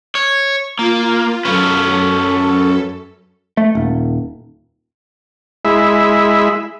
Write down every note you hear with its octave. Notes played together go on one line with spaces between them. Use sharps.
C#5
A#3 F4
F#2 C#4 A4 B4
A3
D#1
G#3 E4 E5